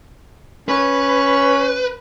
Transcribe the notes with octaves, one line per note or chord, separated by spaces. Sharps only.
C#4 B4